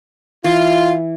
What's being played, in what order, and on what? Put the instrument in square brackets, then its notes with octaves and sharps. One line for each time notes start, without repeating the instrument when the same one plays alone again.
[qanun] E3 [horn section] F4